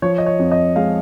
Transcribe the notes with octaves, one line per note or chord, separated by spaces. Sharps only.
F3 C#5
D#5
C#5
F2
D#5
G#3 F5